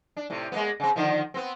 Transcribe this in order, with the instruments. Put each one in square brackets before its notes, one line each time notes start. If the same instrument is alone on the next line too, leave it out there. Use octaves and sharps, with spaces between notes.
[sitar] D4
A2 C3
G#3 A#3 B3
C#3 C4
D3 D#3 F3
B3 C4